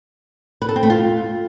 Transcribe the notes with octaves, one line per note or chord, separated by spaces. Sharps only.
B4
A4
C4
A3
F4